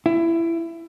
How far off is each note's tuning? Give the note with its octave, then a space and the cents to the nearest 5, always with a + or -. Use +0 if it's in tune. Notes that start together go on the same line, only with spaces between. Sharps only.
E4 +20